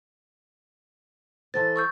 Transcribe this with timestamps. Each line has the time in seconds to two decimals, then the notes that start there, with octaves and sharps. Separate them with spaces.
1.54 E3 A4 C5 A6
1.76 C#6 E6 G6